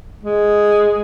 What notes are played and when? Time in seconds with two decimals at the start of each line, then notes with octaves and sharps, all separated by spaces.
0.23 G#3